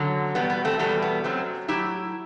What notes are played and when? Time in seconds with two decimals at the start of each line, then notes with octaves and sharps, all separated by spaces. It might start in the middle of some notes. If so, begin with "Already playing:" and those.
Already playing: F#2 D3 F#3
0.35 E2 B2 G3 B3
0.50 B3
0.65 A3 C4
0.79 E2 B2 G3 A3
1.02 B3
1.24 F#2 F#3 A3 C4
1.68 A2 F#3 E4 G4